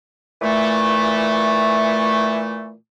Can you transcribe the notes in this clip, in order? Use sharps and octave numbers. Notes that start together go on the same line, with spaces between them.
A#2 E3 A3